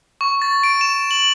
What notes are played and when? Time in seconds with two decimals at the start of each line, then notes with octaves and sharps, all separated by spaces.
0.21 C#6
0.42 A6
0.64 D7
0.81 E7
1.11 F#7